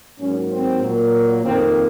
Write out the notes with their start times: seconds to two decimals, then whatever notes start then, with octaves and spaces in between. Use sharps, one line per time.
0.19 G#2 F#3 A#3 C#4
0.50 C4
0.81 A#2 F#3 A#3
1.42 F2 D#3 A#3 C4